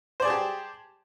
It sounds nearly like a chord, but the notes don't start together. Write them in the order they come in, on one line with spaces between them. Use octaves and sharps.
C5 D5 G#4 A5 G4